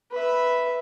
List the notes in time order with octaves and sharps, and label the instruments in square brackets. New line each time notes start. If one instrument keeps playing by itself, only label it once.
[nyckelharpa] B4 E5